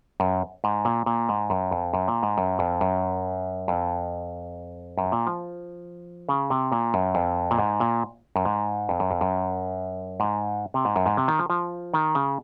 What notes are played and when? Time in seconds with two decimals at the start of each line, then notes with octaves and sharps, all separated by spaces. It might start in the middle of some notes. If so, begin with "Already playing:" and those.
0.20 F#2
0.64 G#2
0.85 A#2
1.06 A#2
1.29 G#2
1.50 F#2
1.71 F2
1.94 F#2
2.08 A#2
2.23 G#2
2.38 F#2
2.59 F2
2.81 F#2
3.68 F2
4.98 F#2
5.12 A#2
5.27 F3
6.29 C#3
6.50 C3
6.72 A#2
6.94 F#2
7.15 F2
7.51 A#2
7.59 G#2
7.80 A#2
8.36 F#2
8.45 G#2
8.89 F2
9.00 F#2
9.11 F2
9.21 F#2
10.20 G#2
10.74 C3
10.85 G#2
10.96 F#2
11.06 G#2
11.17 C3
11.28 D#3
11.39 F3
11.50 F3
11.93 D#3
12.15 C#3